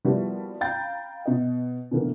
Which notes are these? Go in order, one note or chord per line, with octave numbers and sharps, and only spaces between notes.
F3 G3 A#3 B3 E4 F#4
F5 G5 A#5 B5 G6 A6
B2 D#5
B2 D3 E3 A3 A#3